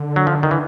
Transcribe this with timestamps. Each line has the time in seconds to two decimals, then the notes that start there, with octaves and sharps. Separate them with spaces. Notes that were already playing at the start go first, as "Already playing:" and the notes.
Already playing: D3
0.16 F#3
0.27 F3
0.43 D#3
0.51 E3